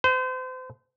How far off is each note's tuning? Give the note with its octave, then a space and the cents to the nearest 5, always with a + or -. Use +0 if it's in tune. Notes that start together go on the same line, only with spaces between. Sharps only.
C5 -35